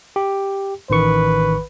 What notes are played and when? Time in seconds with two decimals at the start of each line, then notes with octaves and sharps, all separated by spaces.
0.16 G4
0.90 A1 D#3 B4 C#6